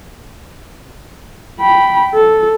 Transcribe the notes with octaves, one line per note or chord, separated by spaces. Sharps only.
G5 B5
A4